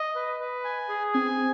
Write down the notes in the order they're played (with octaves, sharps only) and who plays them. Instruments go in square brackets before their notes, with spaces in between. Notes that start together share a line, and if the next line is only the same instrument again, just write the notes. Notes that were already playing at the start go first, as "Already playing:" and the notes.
Already playing: [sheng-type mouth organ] D#5
B4
B4
G#5
G#4
[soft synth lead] C4 [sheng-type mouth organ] G#5